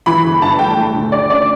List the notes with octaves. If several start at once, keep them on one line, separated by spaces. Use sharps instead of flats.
E3 B5
G1
G2 A5
A3 G5
A3
D2
D3 D5
C#4 D5